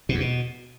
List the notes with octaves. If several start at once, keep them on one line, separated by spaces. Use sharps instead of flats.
B2
E2
B2